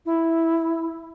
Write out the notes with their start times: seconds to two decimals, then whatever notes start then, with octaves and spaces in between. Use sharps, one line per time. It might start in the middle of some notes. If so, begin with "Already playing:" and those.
0.06 E4